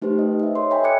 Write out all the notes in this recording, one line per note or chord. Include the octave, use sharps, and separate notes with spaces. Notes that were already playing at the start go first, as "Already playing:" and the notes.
A3 D#4 G4 B4 C5
D#5
D#5 E5
A4 C#5 C6
C#5 E5 G5 G#5 B5
D#5 E5 D6 F#6 G#6 C#7